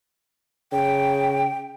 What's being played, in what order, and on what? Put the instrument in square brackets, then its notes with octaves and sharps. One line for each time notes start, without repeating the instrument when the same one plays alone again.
[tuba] C#3 [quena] G5